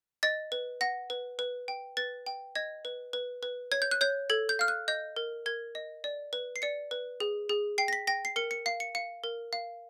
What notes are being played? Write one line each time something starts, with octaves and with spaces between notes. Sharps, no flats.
D#5 A6
B4
F#5 A#6
B4
B4
G5
B4 A6
G5
D#5 G#6
B4
B4
B4
C#5 G#6
G6
F#6
C#5 G6
A4 G#6
G6
F5 F6
F#6
D#5 G6
A#4
A#4 G#6
D#5
D5
B4
C7
D5 C#7
B4
G#4
G#4
G5 C7
A#6
B6
G5 A#6
C7
A#4 C#7
C#7
F5 C7
C#7
F5 C#7
A#4
F5